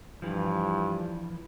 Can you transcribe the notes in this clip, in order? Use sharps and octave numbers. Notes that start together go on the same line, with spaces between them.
G2 E3 F3